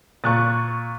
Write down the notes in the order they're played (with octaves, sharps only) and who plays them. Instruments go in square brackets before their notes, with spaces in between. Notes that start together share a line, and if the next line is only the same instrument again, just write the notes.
[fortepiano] A#2 [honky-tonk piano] C#6 F#6 A6